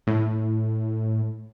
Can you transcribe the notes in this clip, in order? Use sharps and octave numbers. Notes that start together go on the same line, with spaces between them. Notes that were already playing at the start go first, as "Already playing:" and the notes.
A2